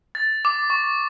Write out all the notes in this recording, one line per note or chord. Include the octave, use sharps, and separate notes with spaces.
A6
D6
C#6